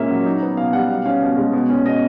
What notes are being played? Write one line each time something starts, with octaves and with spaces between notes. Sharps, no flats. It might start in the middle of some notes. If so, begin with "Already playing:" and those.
Already playing: A#2 G#3 A#3 C#4 E5
F#3
D#4
B3
B2 F5
G3 F#5
B2 F5
C#4 F5
B2
G#3
B2
C#4
B2 D#5